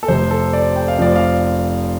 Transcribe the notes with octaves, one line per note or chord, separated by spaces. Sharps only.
A4
F1 F2 C3 C5
A4
D5
G5
F5
F1 F2 F3 C4 D5
F5